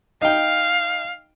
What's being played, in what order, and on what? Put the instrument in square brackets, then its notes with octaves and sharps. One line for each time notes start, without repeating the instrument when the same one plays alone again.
[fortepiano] D#4 G5 [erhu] F5